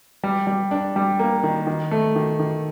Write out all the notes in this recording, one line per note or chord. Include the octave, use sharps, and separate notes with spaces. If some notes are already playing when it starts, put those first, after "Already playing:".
G3
G3
D4
G3
A#3
D#3
D#3
A3
D#3
D#3